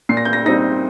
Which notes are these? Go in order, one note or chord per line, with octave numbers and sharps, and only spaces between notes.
A#2 C7
A#6
G6
A#6
G3 C4 D#4 A#6